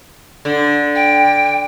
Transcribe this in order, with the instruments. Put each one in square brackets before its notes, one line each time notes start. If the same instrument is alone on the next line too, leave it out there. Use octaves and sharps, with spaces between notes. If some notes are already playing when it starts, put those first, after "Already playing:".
[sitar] D3
[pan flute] G5